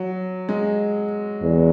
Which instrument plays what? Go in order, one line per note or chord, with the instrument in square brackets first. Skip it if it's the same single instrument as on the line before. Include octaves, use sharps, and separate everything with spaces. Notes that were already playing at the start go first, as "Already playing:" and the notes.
Already playing: [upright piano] F#3
G#3
[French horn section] E2